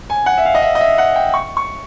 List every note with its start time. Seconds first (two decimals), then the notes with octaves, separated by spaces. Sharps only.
0.10 G#5
0.26 F#5
0.38 E5
0.45 F5
0.55 D#5
0.62 E5
0.75 D#5
0.81 E5
0.98 F#5
1.16 G5
1.34 C#6
1.57 C#6